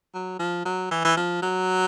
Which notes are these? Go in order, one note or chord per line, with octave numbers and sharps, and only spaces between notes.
F#3
F3
F#3
E3
E3
F3
F#3